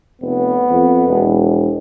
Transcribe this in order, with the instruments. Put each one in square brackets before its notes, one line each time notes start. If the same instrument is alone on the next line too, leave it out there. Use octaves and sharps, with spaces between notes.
[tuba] F1 [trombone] B3
[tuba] F2
E1